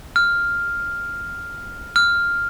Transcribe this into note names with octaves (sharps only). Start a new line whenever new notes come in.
F6
F6